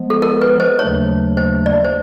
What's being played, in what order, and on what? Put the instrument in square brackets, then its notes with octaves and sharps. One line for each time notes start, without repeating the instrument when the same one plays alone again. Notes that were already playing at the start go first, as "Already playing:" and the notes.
Already playing: [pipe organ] F3 G#3 B3
[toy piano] A4
A#4
B4
C5
[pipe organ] D#2 C#3 F#3 A3 D4 [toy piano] C#5
[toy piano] C5
D5
C5